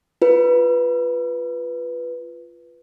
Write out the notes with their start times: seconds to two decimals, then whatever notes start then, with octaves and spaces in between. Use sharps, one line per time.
0.22 F4 B4